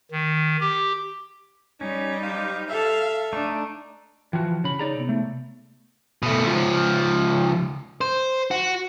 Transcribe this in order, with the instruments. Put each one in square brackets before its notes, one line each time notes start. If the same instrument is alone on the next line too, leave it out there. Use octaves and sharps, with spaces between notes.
[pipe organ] D#3
G4
[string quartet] G3 D#4 [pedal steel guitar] C#4
[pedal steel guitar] G4 C5 [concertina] F5
[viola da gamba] A4 [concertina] E5 [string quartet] F5
[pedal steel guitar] A3 D#4 C#6 [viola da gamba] D4
[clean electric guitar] E3 F3 F#4 [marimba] G5
[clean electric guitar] C#3 B5
[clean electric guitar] D#4 D5 A#5 [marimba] G#4 C#5
[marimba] C3 B3
[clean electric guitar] A3
[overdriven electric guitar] B2 A3
C#2 F3
C5
F#4